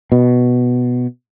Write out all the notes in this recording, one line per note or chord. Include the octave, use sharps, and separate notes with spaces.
B2